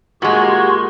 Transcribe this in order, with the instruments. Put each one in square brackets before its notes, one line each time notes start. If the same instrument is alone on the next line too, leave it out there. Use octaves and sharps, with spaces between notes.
[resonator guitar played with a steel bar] A#2 G#3 [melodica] F#4 [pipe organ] G4 C6 C#6